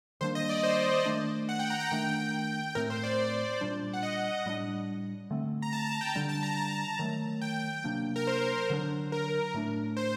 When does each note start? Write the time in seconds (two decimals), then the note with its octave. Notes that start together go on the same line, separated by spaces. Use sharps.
0.21 D#3 G3 A#3 D4 C5
0.35 D#5
0.49 D5
0.63 C5
1.05 D#3 A3 D4
1.49 F#5
1.59 G5
1.70 A#5
1.80 G5
1.91 D#3 A3 D4 G5
2.75 A2 A3 C4 A#4
2.90 C5
3.04 D5
3.61 A#2 G3 D4
3.93 F#5
4.03 D#5
4.46 A2 G3 A#3 D4
5.31 D3 A3 C4
5.62 A#5
5.73 A5
5.87 A5
6.01 G5
6.15 D3 G3 D4 G5
6.29 A5
6.43 A#5
6.57 A5
6.99 D#3 F#3 A3
7.41 G5
7.84 C3 F#3 A#3 D4
8.16 A#4
8.27 C5
8.70 D3 F#3 A3 D4
9.12 A#4
9.54 A2 A3 D4
9.97 C5